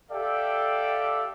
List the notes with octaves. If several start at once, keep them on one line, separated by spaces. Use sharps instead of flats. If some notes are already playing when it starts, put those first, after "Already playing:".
G4 A4 D5 E5 F5 G5